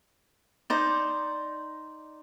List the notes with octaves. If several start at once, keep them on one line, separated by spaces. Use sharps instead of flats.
D#4 C5 D5